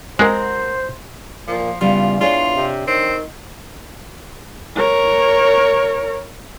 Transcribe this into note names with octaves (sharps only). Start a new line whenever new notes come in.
G#3 C4 F#4 A#4 C5
A#2 F3
E2 C#3 G3 B3 F4
D4 F4 G#4 C#5
C3
D#3 C4
A#4 C#5